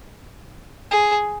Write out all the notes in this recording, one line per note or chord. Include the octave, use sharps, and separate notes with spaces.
G#4